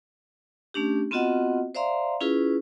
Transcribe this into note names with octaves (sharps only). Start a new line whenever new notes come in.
A3 C#4 D4 G4
B3 C4 F4 F#4 D#5 F#5
C5 D5 E5 F5 A#5 C6
C#4 E4 F4 G#4 B4